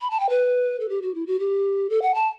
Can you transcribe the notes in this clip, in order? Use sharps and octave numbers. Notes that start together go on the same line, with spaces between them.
B5
A5
G5
B4
A4
G4
F#4
E4
F#4
G4
A4
F#5
A5